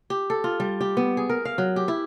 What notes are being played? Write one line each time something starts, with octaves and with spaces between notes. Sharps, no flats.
G4
A4
F4
G3
G4
B3
G#4
A#4
F5
F#3
G4
E4